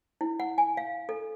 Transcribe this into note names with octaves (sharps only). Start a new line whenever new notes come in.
E4
F#5
G#5
F5
A4